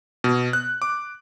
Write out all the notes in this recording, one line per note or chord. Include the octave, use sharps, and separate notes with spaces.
B2
F#6
D6